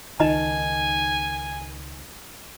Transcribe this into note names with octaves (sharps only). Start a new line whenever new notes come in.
C#2 D#3 D#4 D#5 G#5 A#5